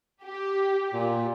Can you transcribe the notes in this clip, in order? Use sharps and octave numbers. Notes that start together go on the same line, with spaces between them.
G4
A#2